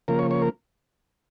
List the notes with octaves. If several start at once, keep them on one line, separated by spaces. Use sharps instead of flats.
C#3 F3 A#3 A#4
C#5
C#5
A#4